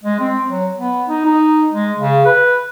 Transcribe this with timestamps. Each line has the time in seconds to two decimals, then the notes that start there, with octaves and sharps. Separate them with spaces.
0.04 G#3
0.20 C4
0.49 F#3
0.78 B3
1.08 D#4
1.25 D#4
1.72 G#3
1.99 C#3
2.25 B4